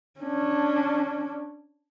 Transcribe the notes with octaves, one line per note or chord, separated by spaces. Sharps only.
C#4 D4